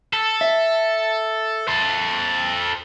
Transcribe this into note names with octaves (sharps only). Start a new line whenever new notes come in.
A4
E5
A4 C5